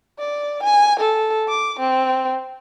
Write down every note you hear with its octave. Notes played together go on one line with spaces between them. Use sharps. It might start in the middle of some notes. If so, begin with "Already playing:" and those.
D5
G#5
A4
D6
C4